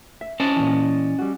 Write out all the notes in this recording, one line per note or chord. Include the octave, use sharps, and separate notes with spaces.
E5
C#4 C5 D#5 A5
A#2 E3
G3 F#4